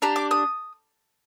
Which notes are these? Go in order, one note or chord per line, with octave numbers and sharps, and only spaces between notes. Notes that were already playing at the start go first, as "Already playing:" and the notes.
D4 G4 A#5
D6
D#6